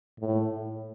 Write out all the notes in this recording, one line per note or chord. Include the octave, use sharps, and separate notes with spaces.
A2